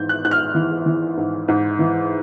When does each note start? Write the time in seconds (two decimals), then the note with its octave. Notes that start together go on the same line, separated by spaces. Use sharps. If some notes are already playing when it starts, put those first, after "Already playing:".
Already playing: G#2 E3 G6
0.09 F#6
0.25 G#2 F#6
0.31 F6
0.55 E3
0.86 E3
1.17 G#2
1.48 G#2
1.79 E3